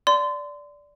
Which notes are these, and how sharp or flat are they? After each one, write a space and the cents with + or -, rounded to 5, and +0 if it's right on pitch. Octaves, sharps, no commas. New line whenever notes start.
D5 -10 C6 -30